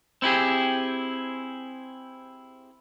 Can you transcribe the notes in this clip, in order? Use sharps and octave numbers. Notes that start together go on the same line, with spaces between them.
C4 E4 G4 G#4